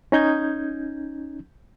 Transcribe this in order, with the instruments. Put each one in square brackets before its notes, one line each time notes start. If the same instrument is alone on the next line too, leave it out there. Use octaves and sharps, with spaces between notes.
[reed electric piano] C#4 D#4 G6 G#6